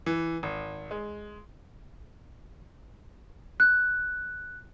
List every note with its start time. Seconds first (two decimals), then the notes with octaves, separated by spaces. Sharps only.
0.06 E3
0.43 G#1
0.91 G#3
3.60 F#6